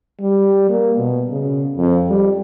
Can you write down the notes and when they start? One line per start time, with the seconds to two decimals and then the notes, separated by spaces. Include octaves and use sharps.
0.21 G3
0.69 A#3
0.97 B2
1.30 C#3
1.77 F2
2.10 G3